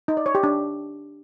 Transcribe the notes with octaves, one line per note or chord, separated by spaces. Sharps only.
D#4
D5
C#5
G4
D4